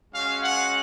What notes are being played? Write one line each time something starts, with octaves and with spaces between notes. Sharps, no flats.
G#3 C#4 F#4 F5
F#5